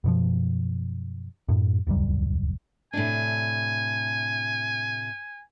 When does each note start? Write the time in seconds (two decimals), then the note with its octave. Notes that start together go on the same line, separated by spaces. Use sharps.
0.04 F#2 B2 F3
1.49 F#2 A2
1.87 D#1 C#2 F#2 G3
2.93 A2 C3 D4 G#5